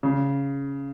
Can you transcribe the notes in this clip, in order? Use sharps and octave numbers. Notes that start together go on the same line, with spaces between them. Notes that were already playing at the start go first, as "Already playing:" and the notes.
C#3